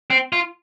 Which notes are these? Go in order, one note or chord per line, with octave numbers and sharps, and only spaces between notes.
C4
F4